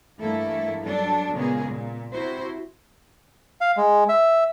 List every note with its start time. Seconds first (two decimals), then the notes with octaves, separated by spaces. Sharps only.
0.19 G2 E3 A3 A#3 E4 A4
0.82 F#3 G3 D4 A4
1.34 A#2 C#3 G#3 A#3 B3 G#4
1.68 A#2
2.12 C3 E4 F#4 C5
3.61 F5
3.77 G#3
4.09 E5